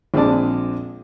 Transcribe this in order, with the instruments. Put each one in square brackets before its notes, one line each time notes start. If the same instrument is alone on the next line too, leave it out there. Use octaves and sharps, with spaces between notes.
[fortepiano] A#1 G#3 C4 D5 A5